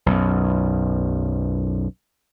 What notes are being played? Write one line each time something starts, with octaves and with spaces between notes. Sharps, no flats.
B1 F#2